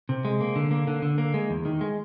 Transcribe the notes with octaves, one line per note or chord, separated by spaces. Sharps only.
C3
G#3
A#3
D3
A#3
D3
D3
A#3
G#3
E2
D#3
G#3